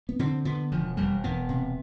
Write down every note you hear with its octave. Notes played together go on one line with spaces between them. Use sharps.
B3
D3 C4
D3 B3
E1 F3
E1 G3
E1 B3
C3